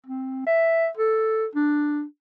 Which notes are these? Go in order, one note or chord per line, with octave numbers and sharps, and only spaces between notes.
C4
E5
A4
D4